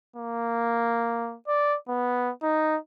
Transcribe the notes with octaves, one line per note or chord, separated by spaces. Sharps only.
A#3
D5
B3
D#4